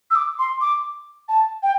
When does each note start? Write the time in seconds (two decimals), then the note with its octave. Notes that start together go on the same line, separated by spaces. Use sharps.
0.10 E6
0.15 D6
0.39 C6
0.61 D6
1.28 A5
1.63 G5